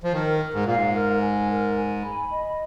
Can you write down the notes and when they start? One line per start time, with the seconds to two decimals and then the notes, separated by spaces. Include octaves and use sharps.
0.03 F3
0.13 D#3 A#4
0.40 A#4
0.53 G#2
0.65 A#2 F5
0.75 G#2
0.94 A#4
1.22 G#5
1.49 A#4
1.76 G#5
2.03 B5
2.31 D#5